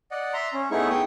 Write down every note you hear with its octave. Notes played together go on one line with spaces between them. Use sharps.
D5 D#5 F#5
E5 A#5 C6
C#4
A3 B3 D#4 E4 G#4 C#6
G5 C#6 D#6